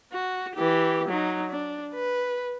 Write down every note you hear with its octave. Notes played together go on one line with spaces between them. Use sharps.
F#4
E3 G4
F#3 D#4
D4
B4